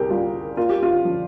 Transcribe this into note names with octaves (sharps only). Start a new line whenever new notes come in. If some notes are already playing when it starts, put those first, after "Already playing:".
Already playing: C2 G4 G#4 A#4
G3 F4
A#3 F4
G4
F4
F3